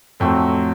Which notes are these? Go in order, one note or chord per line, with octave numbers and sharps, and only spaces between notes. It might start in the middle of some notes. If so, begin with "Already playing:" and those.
F2 A2 F#3 A3 C4